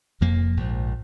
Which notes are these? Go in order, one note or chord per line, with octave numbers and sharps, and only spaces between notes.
F1 F2 F3 A#3
A#1 G#2 F3